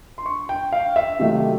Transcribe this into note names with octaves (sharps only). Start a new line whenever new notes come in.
C6
C#6
G5
F5
E5
C3 D#3 F#3 A3